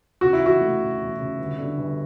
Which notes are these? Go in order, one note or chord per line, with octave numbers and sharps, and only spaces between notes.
C#3 F#4
E4
E3 F#4
A3
C#3
E2
C#3
G1
D3
G1